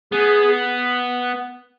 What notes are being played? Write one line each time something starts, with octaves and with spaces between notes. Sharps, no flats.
B3 G#4